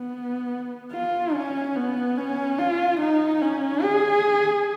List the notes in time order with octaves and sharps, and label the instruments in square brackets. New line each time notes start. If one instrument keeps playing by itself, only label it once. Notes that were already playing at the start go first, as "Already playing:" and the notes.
Already playing: [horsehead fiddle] B3
F4
C#4
B3
C#4
F4
D#4
C#4
G#4